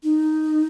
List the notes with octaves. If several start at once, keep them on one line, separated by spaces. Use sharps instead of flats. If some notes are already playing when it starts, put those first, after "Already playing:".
D#4